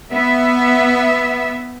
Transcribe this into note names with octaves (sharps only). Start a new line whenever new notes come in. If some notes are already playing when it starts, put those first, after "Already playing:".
B3 E5